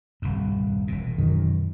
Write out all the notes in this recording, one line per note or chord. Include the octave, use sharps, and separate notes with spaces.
D#1 C2 G2
E1 A#2
F#2 D#3